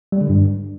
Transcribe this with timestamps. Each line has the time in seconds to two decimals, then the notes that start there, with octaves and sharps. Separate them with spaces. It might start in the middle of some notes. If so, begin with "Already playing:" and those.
0.12 G3
0.21 D3
0.30 G2